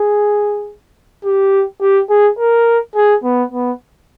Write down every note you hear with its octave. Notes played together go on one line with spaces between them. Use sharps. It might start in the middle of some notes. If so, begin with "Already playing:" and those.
Already playing: G#4
G4
G4
G#4
A#4
G#4
B3
B3